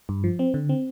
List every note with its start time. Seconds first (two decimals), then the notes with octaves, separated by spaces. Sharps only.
0.09 G2
0.24 F3
0.39 C4
0.54 D3
0.69 C4